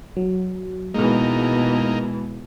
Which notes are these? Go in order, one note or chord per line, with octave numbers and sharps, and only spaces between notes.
F#3
B2 E3 G#3 A#3 D#4